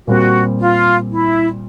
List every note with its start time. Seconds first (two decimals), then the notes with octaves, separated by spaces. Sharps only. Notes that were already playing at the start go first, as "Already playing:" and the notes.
0.07 A#2 G3 C4 F#4
0.59 F4
1.11 E4